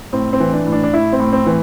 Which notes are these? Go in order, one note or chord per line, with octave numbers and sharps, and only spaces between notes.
A2 C4
C4
E3
D4
A2
D4
D4
A2 E4
C4
A2
C4
E3